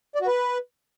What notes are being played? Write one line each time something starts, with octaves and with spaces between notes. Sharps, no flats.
D5
F#4
B4